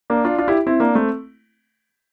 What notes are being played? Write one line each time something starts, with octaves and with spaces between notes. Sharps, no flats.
A#3 D4
D4 F4
D4 F4
E4 G4
C4 E4
A#3 D4
A3 C4